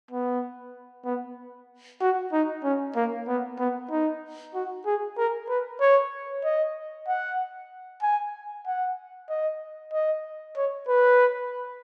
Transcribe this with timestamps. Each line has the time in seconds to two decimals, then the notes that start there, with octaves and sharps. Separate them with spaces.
0.11 B3
1.05 B3
2.01 F#4
2.33 D#4
2.64 C#4
2.96 A#3
3.28 B3
3.59 B3
3.90 D#4
4.55 F#4
4.86 G#4
5.17 A#4
5.49 B4
5.81 C#5
6.44 D#5
7.08 F#5
8.02 G#5
8.67 F#5
9.29 D#5
9.93 D#5
10.57 C#5
10.88 B4